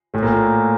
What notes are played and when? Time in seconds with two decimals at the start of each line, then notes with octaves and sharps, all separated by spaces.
0.14 A2 A3
0.23 A#2 A#3